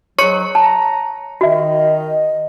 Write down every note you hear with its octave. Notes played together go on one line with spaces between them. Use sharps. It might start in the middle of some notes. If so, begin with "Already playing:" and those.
G#2 F#3 C#5 C#6 C#7
A5 A#5
D#3 F#4 D#5 E5